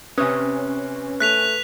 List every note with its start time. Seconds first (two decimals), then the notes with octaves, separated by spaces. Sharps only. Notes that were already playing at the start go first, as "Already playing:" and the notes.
0.18 C3 C#4 B4 D#6
1.20 A3 F#6 B6 F7